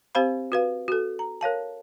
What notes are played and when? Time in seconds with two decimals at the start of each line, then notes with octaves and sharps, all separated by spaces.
0.15 C4 G4 C5 F5 B5
0.52 F#4 B4 F5
0.88 F#4 A4
1.19 A#5
1.41 A#4 C#5 F5 A5